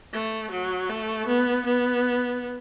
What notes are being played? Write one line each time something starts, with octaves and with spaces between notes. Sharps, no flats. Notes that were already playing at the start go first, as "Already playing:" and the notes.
A3
F#3
A3
B3
B3